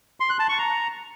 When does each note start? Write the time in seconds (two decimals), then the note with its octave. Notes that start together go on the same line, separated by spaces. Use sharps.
0.20 C6
0.30 F#6
0.39 A5
0.49 C#6
0.58 A#5